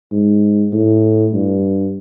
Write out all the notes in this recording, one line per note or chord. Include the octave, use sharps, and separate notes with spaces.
G#2
A2
G2